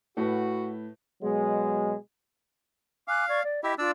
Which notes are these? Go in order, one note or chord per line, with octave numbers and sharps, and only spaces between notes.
A2 F#4 B4
B2 F#3 G#3
F5 G#5 D6 F#6
D5 C#6 G#6
D5
E4 G4 D#5 E5
D4 F4 D5 E6